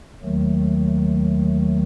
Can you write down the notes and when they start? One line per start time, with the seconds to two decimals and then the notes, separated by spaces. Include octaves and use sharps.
0.22 D#2 D#3 F#3 A3